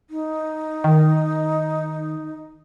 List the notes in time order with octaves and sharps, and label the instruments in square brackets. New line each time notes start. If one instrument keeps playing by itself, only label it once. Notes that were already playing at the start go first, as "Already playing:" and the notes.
[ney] D#4
[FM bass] D#3